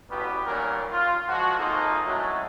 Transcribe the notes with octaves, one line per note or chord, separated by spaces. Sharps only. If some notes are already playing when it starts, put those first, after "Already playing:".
A1 G3 B3 F#4 G4 B4
D#2 A#2 F#3 G3 C#4 A#4
F4
F3 G#3 F4 F#4
G#1 A#3 D#4 F4 A4
F#3 G#3 A3 C#4 E4 F#4